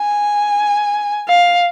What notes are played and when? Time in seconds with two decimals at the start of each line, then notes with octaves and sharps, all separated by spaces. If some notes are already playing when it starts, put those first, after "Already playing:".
Already playing: G#5
1.28 F5